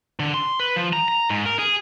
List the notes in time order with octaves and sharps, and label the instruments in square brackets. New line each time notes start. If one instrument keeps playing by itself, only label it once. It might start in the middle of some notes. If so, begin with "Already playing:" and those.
[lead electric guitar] D3
C6
B4
F3
A#5
A#5
G#2
A#4
G#4